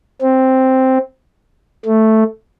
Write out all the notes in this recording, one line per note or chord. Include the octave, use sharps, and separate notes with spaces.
C4
A3